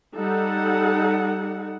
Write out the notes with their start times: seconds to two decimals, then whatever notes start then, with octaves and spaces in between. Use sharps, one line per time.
0.16 G3 D#4 A4 F#5